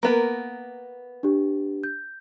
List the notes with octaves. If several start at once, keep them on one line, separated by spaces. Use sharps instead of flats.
A#3 B3 A#4
D4 G4
G6